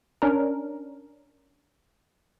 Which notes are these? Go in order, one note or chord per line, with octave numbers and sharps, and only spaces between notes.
C#4 D4 A#4